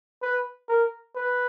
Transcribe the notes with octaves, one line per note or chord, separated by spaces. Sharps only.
B4
A#4
B4